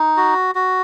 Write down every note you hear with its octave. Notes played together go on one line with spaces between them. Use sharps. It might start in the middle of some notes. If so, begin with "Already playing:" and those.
Already playing: D#4
F#4
F#4